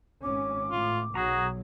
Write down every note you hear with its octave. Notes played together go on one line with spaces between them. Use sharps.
G#1 C#4 D6
A2 F4
B1 F#3 F#4 G#4 A#5